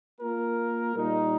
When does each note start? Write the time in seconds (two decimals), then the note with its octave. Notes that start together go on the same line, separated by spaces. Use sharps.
0.20 A#3 F4 A#4
0.94 A#2 G3 D#4